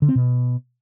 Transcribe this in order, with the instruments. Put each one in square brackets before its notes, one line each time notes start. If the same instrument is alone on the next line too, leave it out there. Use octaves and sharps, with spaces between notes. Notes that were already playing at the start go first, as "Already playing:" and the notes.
[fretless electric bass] D3
C4
B2